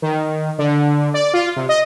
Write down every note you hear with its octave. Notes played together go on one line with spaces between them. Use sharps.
D#3
D3
D5
F4
C3
D#5